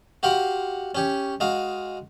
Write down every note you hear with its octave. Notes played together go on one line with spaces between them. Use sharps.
F#4 G4 F5 F#5 C6 D6
C#4 G4 C#5
G#3 F#4 F5